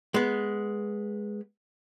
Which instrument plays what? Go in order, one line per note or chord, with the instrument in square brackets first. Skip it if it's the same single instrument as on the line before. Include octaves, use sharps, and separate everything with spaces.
[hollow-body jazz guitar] G#3 B3